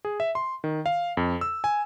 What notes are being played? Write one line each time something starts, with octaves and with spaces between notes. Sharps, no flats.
G#4
E5
C6
D#3
F5
F2
E6
G#5